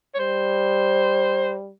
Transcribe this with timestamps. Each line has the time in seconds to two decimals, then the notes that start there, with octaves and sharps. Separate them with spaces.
0.15 C#5
0.19 G3 C5